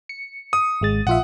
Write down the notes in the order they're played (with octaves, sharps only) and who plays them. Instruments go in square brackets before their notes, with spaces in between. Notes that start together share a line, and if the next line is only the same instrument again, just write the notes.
[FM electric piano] C#7
[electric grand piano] D#6
[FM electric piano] G#1 G#3 A6
[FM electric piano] A#1 F4 E5 [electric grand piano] F#5